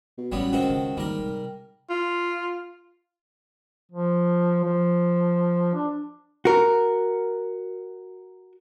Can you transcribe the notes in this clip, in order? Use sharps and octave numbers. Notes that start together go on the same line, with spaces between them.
B2
A1 F#3 G3 B3 C#4
C#2 D#3 C4 F#4
C#3
G#2 D#3 G3 A#3 A#4
C3
F4
F3
F3
D4
F#4 A#4